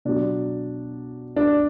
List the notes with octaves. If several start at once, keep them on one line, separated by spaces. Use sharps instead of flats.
B2 F#3 D4
D4